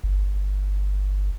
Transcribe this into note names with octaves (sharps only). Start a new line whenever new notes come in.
G1